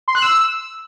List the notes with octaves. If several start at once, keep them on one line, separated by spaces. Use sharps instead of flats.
C6
F#6
E6